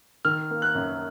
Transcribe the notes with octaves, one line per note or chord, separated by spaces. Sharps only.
D#3 F6
A#3
F#6
F#2